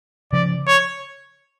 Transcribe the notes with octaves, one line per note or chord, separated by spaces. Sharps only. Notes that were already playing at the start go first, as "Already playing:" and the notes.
C#3 F3 D5
C#5